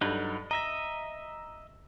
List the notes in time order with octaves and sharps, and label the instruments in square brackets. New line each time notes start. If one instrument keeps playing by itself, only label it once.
[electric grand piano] G2 A4 [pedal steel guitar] F#3 D#4 B4
[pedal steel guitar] D#5 E5 [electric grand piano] A#5 A#6